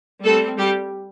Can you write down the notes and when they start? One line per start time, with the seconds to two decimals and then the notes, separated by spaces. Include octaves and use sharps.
0.24 G3 A3 C4 A4
0.58 G3 G4